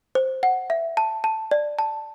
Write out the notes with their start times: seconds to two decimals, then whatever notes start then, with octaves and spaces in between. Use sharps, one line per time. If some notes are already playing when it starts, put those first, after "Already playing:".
0.15 C5
0.43 F#5
0.70 E5
0.97 A5
1.24 A5
1.51 D5
1.79 A5